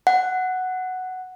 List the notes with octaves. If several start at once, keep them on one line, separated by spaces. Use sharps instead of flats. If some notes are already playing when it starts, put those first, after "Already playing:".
F#5